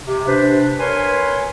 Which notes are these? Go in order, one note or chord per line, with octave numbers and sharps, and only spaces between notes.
C3
C3 D4 B4 C5
A#4 B4 C#5 G#5 C6